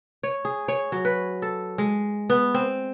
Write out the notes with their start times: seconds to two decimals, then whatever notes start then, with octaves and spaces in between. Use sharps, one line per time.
0.23 C#5
0.45 G#4
0.68 C#5
0.92 F#3
1.05 B4
1.42 A4
1.78 G#3
2.30 B3
2.54 C4